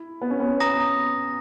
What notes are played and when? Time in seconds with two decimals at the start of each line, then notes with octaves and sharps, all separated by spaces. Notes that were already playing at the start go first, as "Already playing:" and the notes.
Already playing: E4
0.22 B3
0.30 C#4
0.40 B3
0.60 A#5 D#6 A#6